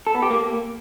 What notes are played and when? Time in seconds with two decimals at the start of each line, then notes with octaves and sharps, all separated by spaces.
0.07 A4
0.14 B3
0.22 G4
0.30 A#3